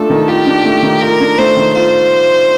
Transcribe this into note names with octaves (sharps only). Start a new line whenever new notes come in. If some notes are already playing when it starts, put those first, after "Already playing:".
Already playing: A3 D4 F4 A4
D#3
F4 G4
D4
A3
D#3
F4 A#4
D4
A3 C5
D#3
F4 C5